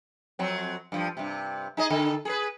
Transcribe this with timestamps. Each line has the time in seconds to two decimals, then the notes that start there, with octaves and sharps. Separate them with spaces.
0.39 F2 F#3 C4
0.92 G2 F3
1.17 G2 C3
1.77 D#4 G#4 D#5
1.90 D3 D#3 A4
2.25 G#4 A4 B4